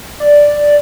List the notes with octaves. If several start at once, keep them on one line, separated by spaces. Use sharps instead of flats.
D5